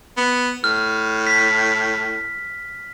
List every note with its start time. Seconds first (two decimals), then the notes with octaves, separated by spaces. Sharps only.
0.17 B3
0.64 A2 F6
1.27 B6